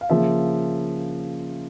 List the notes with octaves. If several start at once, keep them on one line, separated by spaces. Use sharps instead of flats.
F5
C#3 F3 A#3 E5